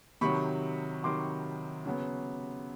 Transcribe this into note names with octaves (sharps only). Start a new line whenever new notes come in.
C3 D#3 F#3 B5 C#6
C3 D#3 F#3 C6 D6
C#3 F#3 B3